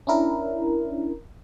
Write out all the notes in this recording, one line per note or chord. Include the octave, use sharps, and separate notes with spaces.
C#4 D4 E4 A#4